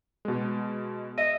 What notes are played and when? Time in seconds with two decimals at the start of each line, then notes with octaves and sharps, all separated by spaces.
0.25 B2 G#3
1.18 D#5 E5